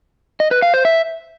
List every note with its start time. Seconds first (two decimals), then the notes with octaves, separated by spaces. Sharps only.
0.40 D#5
0.51 B4
0.62 F5
0.74 C5
0.85 E5